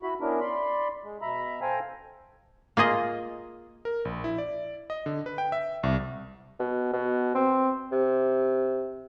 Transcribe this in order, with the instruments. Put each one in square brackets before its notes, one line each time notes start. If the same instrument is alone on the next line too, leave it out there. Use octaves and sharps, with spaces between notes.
[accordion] E4 F#4 B5
B3 C#4 D4 E4 A#4
D5 B5 C6
G#3
B2 E5 A#5 B5
A4 C5 F5 G5 G#5 A#5
[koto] A#3 F4 G#4 D#5
[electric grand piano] A#4
A#1
E4
D5
D#5
D3
B4
G5
E5
C2
[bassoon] B2
B2
C4
C3